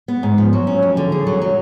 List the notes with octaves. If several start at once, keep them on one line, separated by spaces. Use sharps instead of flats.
B3
G#2
F3
F#3
C#4
F2
D3
G#4
F#3
F#3